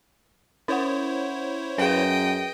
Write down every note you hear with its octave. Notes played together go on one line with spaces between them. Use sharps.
C#4 E4 C5 C#5 F#5
F#2 G#4 B4 D#5 G5